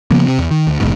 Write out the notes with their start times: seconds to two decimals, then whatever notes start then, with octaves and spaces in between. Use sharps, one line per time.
0.11 C#3 F3 A#3 B3
0.25 C3 C4
0.38 E2
0.51 D#3
0.67 D2
0.80 D#1 A1 G#2 B2